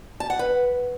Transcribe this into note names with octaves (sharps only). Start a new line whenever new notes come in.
A5
F#5
B4